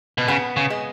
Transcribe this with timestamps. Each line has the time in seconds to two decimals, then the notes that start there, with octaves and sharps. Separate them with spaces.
0.18 B2
0.28 C#3 B3
0.56 C#3
0.70 G#3